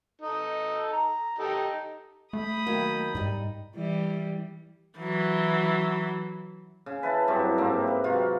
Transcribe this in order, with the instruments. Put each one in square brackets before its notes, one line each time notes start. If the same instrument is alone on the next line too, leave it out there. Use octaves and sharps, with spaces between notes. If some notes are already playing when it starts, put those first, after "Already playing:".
[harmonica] D#4 A4
A#5
D#4 G4 A4
[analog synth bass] A3 [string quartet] B5 D#6 G6
[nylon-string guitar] D#3 F#3 A#3
[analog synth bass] G#2 [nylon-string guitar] G3 D#4
[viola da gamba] E3 G3
[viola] E3 F#3
[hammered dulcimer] C#3
B4 E5 A5
G2 F#3 C4 E4
G#2 A#3 C4
B4
C3 F#3 F4 F#4